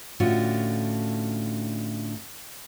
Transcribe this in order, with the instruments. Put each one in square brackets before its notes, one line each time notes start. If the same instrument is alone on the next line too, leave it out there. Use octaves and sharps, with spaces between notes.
[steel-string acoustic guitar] A2 D3 C#4 D4 F4 F#4